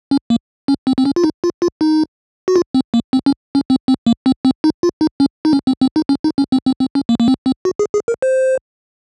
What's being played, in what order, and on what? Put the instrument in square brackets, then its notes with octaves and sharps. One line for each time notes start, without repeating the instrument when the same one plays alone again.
[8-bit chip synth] C#4
A#3
C#4
C4
C4
C#4
F4
D#4
F4
F4
D#4
F#4
F4
C4
A#3
C4
C#4
C#4
C4
C4
A#3
C4
C4
D#4
F4
D#4
C#4
D#4
C#4
C4
C4
D#4
C#4
D#4
C#4
C4
C4
C4
C#4
A#3
A#3
C4
C4
F#4
G#4
G#4
A#4
C5